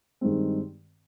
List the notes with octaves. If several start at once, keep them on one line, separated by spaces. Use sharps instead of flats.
G2 D#3 G#3 C4